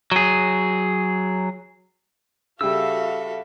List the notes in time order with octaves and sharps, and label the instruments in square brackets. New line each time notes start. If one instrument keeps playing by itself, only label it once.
[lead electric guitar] F#3 G#4
[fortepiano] C#3 G3 [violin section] F#4 F5 [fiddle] A4 E5 [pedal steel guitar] E6